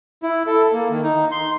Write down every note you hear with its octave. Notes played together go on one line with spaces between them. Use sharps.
E4
A4
A#3
D#3
D#4
C6